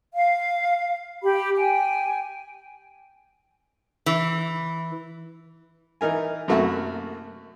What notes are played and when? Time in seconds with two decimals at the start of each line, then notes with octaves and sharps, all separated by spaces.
0.14 F5
1.23 G4 B5
1.56 G5 G#5
4.06 E3
6.01 E3 D#4 A#4 G#5
6.48 F#2 C3 A3 A#3 E4 F#4